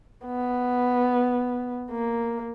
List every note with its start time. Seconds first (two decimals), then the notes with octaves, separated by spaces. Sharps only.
0.26 B3
1.91 A#3